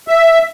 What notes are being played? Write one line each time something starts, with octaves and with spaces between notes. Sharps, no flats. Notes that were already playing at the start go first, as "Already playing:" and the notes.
E5